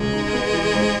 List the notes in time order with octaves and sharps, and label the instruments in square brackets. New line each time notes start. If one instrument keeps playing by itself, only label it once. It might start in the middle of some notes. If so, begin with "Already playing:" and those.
Already playing: [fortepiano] C#2 [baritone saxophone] G#3
[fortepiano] D#4
B3
E3
G#2